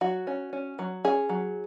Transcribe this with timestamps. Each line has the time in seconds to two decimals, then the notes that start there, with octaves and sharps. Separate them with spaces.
0.01 F#3 F#4
0.27 C#4
0.53 C#4
0.79 F#3
1.05 C#4 G#4
1.29 F#3